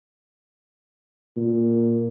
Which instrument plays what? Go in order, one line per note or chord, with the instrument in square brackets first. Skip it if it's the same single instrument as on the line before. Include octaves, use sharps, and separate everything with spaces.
[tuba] A#2